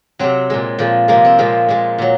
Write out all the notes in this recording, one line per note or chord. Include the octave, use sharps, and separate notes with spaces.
C3 F#3 C4
A#2 G#3
A#2 F3 G#3
C3 F3 G#3 A#3
C4
A#2 F3 G#3 C4
A#2 G#3
A#2 F#3